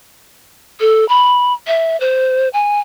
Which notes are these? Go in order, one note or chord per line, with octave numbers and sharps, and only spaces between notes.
A4
B5
E5
C5
G#5